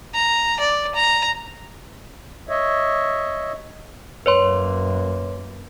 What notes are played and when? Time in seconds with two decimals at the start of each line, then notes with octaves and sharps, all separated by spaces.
0.14 A#5
0.60 D5
0.95 A#5
2.49 C#5 D#5 E5
4.26 F#2 A#3 B4 C#5 C6